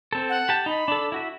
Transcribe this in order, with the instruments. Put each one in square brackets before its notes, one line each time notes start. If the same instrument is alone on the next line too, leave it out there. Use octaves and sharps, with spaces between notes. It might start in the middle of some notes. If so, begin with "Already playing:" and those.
[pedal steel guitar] C4 A4
[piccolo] F#5
[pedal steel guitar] G4 A5
[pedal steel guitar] D#4 [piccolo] B5
[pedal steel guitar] D4 A4
E4 F#4 E5